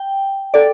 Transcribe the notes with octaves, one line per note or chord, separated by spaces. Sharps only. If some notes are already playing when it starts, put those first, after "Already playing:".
Already playing: G5
A4 D5